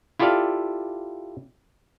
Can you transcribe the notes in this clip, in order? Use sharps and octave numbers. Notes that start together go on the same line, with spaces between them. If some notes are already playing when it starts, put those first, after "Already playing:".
E4 F4 G4 A4 D5 F5